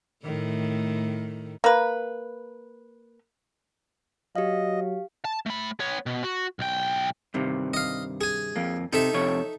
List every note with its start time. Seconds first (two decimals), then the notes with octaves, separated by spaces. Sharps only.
0.23 A2 D#3 A3
1.64 A#3 B4
4.36 F#3 G4 D#5 F5
5.25 A5
5.46 A3 B5
5.80 B3 C#5
6.06 B2
6.24 F#4
6.59 B1 G5
7.34 G2 C3 D#3
7.74 D#5 F5
8.21 G#4 G#5
8.56 F2 A#3
8.93 C3 D#4 A4 E5
9.14 F2 C3 C#5